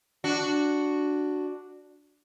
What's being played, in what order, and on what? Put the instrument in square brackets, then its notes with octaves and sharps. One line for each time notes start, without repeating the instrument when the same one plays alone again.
[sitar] D4 F#4